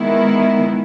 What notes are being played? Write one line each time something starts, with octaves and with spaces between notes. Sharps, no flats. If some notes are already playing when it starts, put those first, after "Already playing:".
Already playing: D#3 G#3 B3 E4